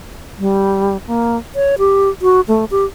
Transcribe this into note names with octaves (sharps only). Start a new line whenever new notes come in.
G3
A#3
C#5
G4
F#4
A3
G4